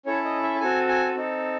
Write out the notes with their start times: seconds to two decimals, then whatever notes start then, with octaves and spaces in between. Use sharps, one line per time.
0.06 C#4 E4 A4 C#5
0.25 D#5
0.43 E5
0.55 A5
0.60 C4 F#4 A4 G#5
0.88 G#5
1.15 C4 D#4 A4